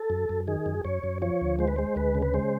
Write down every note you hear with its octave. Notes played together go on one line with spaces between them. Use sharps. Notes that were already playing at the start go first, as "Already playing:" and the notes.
Already playing: A4
F#2
F#2
D#3 G#4
F#2
F#2 C#5
F#2
F3 C#5
D2
G#3 C5
B4
G#3 C5
D2 B4
C#3
B4
G#3 C5